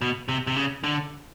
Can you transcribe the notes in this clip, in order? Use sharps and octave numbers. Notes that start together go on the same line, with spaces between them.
B2
C3
C3
C#3
D3